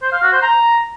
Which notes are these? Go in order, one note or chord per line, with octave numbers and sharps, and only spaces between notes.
C5
F5
F#4
C5
A#5